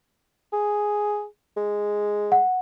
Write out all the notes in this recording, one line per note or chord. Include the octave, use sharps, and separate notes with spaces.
G#4
G#3
F#5